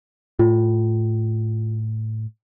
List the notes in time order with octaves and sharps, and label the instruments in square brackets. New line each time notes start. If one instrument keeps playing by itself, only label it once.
[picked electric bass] A2 [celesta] F4